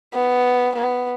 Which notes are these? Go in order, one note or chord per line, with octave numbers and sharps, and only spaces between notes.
B3
B3